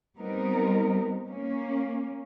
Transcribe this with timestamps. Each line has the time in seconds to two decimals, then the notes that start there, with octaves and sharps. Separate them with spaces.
0.18 G3 B3 C4 D#4 A#4
1.25 A#3 C#4